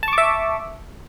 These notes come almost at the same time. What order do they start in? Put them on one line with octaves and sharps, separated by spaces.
A5 C#6 D6 E5